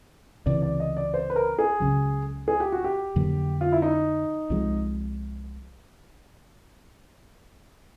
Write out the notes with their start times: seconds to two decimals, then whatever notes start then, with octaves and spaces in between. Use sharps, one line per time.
0.46 C#2 C3 E3 D5
0.62 D5
0.80 D#5
0.97 D5
1.14 C5
1.30 B4
1.36 A#4
1.59 G#4
1.80 C#2 C#3 F#3
2.48 G#4
2.60 G4
2.72 F#4
2.84 G4
3.16 F2 D3 F#3 A#3
3.61 F4
3.72 E4
3.82 D#4
4.50 C2 C3 F3 G#3